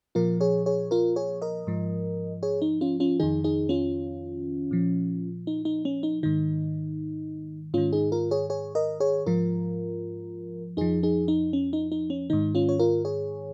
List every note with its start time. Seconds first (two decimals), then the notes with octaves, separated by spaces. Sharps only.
0.15 A#2 F3 F4 A#4
0.41 G#4 C#5
0.66 G#4 C#5
0.91 F4 A#4
1.16 G#4 C#5
1.42 A#4 D#5
1.67 G#2 F3
2.43 G#4 C#5
2.62 D#4
2.81 C#4 F4
3.00 C#4 F4
3.20 F2 D#3 D#4 G#4
3.44 D#4 G#4
3.69 C#4 F4
4.71 A#2 F3
5.47 D#4
5.65 D#4
5.85 C#4
6.03 D#4
6.23 G#2 D#3 D#4
7.74 G#2 D#3 C#4 F4
7.93 D#4 G#4
8.12 F4 A#4
8.31 G#4 C#5
8.50 G#4 C#5
8.75 A#4 D#5
9.00 G#4 C#5
9.26 G#2 F3 F4 A#4
10.77 F2 F3 D#4 G#4
11.03 D#4 G#4
11.28 D#4
11.53 C#4
11.73 D#4
11.92 D#4
12.10 C#4
12.30 G#2 D#3 D#4
12.55 C#4 F4
12.69 C#5
12.79 F4 A#4
13.05 G#4 C#5